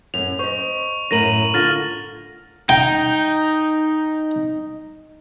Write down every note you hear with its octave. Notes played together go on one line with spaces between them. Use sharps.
F#2 C#4 F7
C5 D#5 C#6
F#2 A2 A#4 A#6 D#7 F#7
D3 F4 F6 A6 A#6
D#4 G5